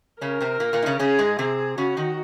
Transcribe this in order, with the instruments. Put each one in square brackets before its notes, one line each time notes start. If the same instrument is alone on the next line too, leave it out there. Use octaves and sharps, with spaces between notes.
[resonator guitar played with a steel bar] C#3 C#4 [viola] A#4
[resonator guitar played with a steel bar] C3 C4
A#2 A#3
A#2 A#3
D#4
C#3 C#4
[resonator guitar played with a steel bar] C#3 C#4 [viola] G#4
[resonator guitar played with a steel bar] G#2 G#3
[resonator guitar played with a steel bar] C3 C4 [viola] G#4
[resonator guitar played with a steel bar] C#3 C#4 [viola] F#4
[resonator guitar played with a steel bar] D#3 D#4